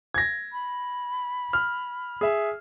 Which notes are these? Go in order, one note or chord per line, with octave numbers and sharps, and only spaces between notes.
G#6 A#6
B5
F6
G#4 E5